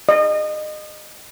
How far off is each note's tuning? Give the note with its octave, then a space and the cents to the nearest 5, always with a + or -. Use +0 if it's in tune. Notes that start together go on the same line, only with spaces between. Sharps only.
D#5 -30